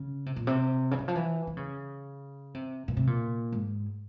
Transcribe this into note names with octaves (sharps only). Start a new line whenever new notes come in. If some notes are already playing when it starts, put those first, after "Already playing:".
Already playing: C#3
C3
A#2
C3
C#3
E3
F3
E3
E3
C#3
C3
A#2
C3
A#2
G#2